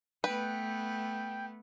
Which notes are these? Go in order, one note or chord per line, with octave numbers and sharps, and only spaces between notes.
A3 B3 B4 G5